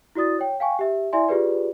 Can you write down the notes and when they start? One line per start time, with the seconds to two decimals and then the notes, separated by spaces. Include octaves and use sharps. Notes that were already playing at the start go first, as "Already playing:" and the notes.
0.15 E4 F#4 D5 D#6 A6
0.39 C#5 G5
0.60 F5 G5 G#5 C#6
0.79 G4 E5
1.13 E4 D5 E5 G#5 C6
1.28 F4 G4 G#4 B4 D5